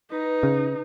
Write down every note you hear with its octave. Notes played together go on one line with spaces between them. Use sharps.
D#4 B4 A#6
C#3